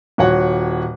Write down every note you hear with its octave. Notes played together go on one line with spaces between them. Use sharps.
D#1 F#4 C#5 F#5